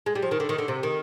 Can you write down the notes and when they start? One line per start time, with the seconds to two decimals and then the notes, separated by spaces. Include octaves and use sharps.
0.06 G#3
0.15 G3
0.22 F3
0.31 D#3
0.40 D3
0.49 D#3
0.58 D3
0.68 C3
0.83 D#3